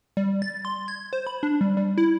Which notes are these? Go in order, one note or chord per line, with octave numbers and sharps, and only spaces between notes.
G3
A6
C6
G#6
C5
B5
D4
G3
G3
E4